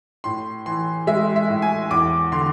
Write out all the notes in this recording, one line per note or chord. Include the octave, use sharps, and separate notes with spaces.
A2 C6
E3 C6
G#3 E5
E5
A2
G#5
E2 D6
D3 C6